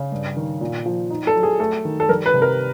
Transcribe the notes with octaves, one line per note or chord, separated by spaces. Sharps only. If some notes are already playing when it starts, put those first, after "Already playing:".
Already playing: C#3
G2
D#3
A#2
F3
D#4
A4
F#3
G#4
A3 A4
D#3
A4
G3 A#4
B4
C3
A#4